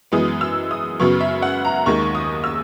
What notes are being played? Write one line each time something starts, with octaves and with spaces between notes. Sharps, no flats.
F#2 E3 G#3 B3 D#6
E6
D#6
F#2 C#3 F#3 B3 C#6
E5
F#5
A#5
D#2 D#3 G#3 C#6
D#6
E6